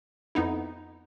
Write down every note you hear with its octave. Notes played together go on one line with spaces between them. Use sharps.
F2 B3 D#4 E4